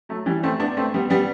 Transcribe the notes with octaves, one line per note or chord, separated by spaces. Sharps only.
F#3 A3
E3 G3
A3 C4
B3 D4
A3 C4
G3 B3
G3 B3